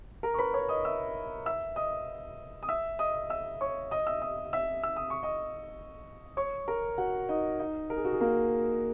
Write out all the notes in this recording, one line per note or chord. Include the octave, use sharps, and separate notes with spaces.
A#4 A#5
C#6
B4 B5
C#5 C#6
D#5 D#6
E5 E6
E5 E6
D#5 D#6
D#6
E5 E6
D#5 D#6
E5 E6
C#5 C#6
D#5 D#6
E5 E6
D#5 D#6
E5 E6
E6
D#6
C#6
D#5 D#6
C#5 C#6
A#4 A#5
F#4 F#5
D#4 D#5
D#4 D#5
A#4
G#4
F#4
G#4
A#3 A#4